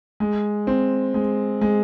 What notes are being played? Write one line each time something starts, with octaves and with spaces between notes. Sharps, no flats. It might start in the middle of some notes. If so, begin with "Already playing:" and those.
G#3
C4
G#3
G#3